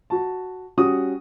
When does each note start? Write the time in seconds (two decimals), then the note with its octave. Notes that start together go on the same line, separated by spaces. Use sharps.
0.10 F#4 A5
0.77 G3 C#4 F#4 D#6